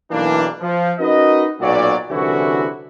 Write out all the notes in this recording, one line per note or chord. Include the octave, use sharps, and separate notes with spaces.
B1 E3 A#3 D4
F3
C#4 D#4 F#4 A#4 B4 D#5
B1 A#2 F#3 D5
C2 D3 E3 C#4 E4 F#4